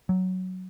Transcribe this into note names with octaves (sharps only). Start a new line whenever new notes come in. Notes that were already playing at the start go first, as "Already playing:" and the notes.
F#3